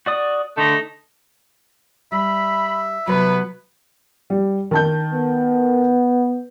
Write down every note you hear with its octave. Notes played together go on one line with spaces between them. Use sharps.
F#4 D5 D#6
D3 A3 D#4
G3 E5 B5
C3 F#3 B3 B4
G3
D#3 A5 G6
B3